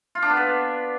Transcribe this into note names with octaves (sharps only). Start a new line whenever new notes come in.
F4
D4
B3
B4